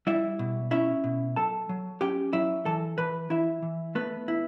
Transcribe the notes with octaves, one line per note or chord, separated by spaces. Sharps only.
G3 E4 E5
B2
C#4 E4 E5
B2
F#3 A4 A5
F#3
C#4 G4 G5
F#3 E4 E5
E3 A4 A5
E3 B4 B5
E3 E4 E5
E3
A3 B3 B4
E4